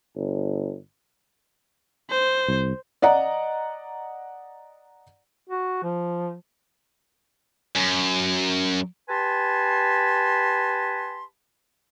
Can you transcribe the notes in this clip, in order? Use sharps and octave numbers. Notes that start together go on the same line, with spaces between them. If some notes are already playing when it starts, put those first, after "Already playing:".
G1
C5
C2
D5 D#5 F#5 A#5
F#4
F3
F#2
G4 B4 G#5 A5 B5 C6